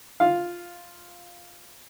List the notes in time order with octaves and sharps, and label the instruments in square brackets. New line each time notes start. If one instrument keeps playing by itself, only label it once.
[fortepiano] F4 F5